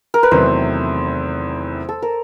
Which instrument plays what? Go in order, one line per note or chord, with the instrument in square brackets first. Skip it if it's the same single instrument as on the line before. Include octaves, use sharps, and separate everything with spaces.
[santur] A#4
B4
[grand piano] E2 C3 D#3 F#3 A3 [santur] C5
[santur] A4
A#4